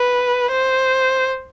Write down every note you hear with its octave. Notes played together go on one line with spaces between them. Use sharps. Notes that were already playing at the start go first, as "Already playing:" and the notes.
Already playing: B4
C5